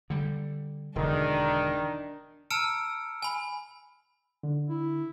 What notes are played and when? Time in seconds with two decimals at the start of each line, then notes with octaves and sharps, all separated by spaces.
0.10 D3 G3
0.96 E1 D3 D#3 D4
2.50 A5 A#5 E6 F6 C#7 D7
3.22 G#5 B5
4.43 D3
4.69 E4